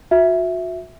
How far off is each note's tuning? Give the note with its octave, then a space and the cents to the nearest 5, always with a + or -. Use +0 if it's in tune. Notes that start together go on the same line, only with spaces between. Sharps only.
F#4 -35 E5 +0